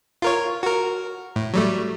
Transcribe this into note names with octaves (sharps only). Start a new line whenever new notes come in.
F4 A#4 C#5
F#4 A#4
A2
F#3 G3 A3